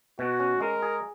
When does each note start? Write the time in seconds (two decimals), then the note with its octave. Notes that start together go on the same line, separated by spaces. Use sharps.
0.19 B2 F#4
0.40 C#4
0.61 G#3 A#4
0.82 G#4